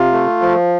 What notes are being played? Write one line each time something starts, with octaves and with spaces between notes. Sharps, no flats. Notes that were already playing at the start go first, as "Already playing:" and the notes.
Already playing: C3 F4
A3
F3